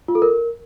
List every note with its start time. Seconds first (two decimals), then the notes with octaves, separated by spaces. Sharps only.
0.08 F4
0.15 A4
0.22 A#4